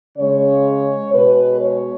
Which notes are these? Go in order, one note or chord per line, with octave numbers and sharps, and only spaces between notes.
C#3 G#3 C#5
B2 G#3 B4
C#5